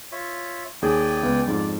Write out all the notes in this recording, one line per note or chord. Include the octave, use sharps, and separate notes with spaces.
F4 C#5 E5
D#2 G#4 D5 G5 G#5
C#2 B3
F2 G#2 D5